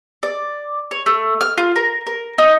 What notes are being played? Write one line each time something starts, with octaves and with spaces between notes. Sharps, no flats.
D5
C#5
A3
F6
F4
A#4
A#4
D#4